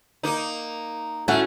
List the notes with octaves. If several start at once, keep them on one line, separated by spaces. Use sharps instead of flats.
A#3 D#4
A3 C#4 E4 F#4